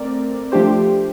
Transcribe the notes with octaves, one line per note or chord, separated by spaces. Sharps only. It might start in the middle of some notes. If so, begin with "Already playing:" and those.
Already playing: A3 C4 A#4 D5
F3 A3 D4 G4 C5